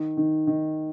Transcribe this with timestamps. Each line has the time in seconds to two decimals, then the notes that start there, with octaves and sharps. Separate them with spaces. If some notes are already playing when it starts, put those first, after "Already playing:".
Already playing: D#3
0.17 D#3
0.47 D#3